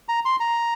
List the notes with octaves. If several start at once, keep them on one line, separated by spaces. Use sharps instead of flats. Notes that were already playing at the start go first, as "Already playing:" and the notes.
A#5
C6
A#5